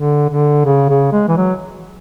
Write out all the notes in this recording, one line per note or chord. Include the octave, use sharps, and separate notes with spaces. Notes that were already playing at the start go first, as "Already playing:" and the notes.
Already playing: D3
D3
C#3
C#3
G#3
E3
F#3